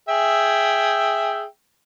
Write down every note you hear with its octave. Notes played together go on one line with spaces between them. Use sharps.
G#4 E5 G5